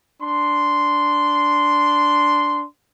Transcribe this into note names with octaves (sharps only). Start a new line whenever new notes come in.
D4 C6